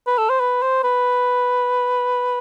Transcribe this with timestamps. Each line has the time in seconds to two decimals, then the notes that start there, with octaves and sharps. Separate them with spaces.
0.07 B4
0.18 A4
0.30 C5
0.40 B4
0.62 C5
0.84 B4